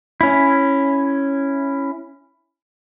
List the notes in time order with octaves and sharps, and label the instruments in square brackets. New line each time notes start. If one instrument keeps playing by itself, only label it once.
[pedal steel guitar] C#4 E4